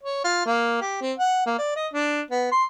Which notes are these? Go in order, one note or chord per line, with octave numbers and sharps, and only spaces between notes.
C#5
F4
A#3
G4
C4
F#5
A#3
D5
D#5
D4
B3
C6